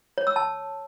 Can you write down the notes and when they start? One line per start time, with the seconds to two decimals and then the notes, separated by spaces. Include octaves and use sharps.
0.18 C#5
0.27 E6
0.36 A5